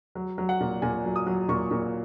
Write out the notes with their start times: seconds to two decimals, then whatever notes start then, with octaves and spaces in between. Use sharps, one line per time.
0.15 F#3
0.38 F#3
0.49 F#5
0.60 A#2
0.82 A#2 G#5
1.05 F#3
1.16 D#6
1.27 F#3
1.49 A#2 C#6
1.71 A#2